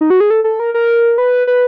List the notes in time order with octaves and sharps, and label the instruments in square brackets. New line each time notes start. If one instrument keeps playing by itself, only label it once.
[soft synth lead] D#4
F#4
G#4
A4
A4
A#4
A#4
B4
B4